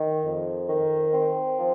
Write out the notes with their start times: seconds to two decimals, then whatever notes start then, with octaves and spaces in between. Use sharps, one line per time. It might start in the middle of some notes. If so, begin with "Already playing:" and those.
Already playing: D#3
0.25 F2
0.69 D#3
1.14 C4
1.58 F3